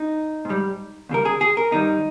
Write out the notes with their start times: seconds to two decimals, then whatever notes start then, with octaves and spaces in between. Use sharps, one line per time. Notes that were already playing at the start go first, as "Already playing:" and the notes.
Already playing: D#4
0.45 G#2
0.50 G3
1.09 D#2 C#3 G3 A#4
1.25 G#4
1.41 G#4
1.57 A#4
1.72 G2 D#3 G3 D#4